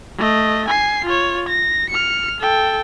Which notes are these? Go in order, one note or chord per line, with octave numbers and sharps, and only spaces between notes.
A3 D#5
G#5 C7
F4 C#5
A#6
F6 C#7
A4 G5